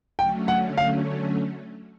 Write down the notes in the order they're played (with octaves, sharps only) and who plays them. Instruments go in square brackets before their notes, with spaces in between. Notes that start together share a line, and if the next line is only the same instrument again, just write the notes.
[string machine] D3 F#3 A3 C#4 [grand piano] G5
[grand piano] F#5
F5